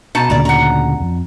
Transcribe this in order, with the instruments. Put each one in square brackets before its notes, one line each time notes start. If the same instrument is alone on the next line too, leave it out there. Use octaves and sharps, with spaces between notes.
[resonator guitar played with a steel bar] B2 D#4 A5
[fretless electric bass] D2 A#2 C#3 [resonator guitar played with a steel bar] D5 A#5
[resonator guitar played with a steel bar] F#5 A#5
[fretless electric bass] F2